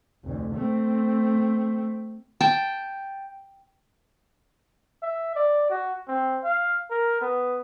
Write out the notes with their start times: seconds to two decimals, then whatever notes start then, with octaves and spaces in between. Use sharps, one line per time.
0.24 F1 D2
0.54 A3 C4
2.41 G5 A5
5.03 E5
5.36 D5
5.70 F#4
6.08 C4
6.44 F5
6.91 A#4
7.21 B3